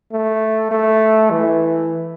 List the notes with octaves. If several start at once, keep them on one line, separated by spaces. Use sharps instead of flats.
A3
A3
E3